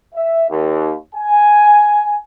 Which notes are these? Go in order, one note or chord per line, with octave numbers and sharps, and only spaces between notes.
E5
D#2
G#5